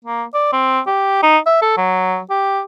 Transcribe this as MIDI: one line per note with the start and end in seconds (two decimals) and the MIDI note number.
0.05 0.25 58
0.34 0.51 74
0.52 0.80 60
0.87 1.18 67
1.23 1.38 63
1.46 1.60 76
1.62 1.76 69
1.77 2.20 54
2.30 2.61 67